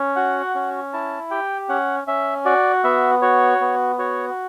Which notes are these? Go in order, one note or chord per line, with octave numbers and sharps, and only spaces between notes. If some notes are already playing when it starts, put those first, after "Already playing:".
Already playing: C#4
F#4 F#5
C#4
E4 A5
G4 G5
C#4 F#5
C#4 E5
F#4 D5
B3 E5
F#4 C#5
B3
F#4 C#5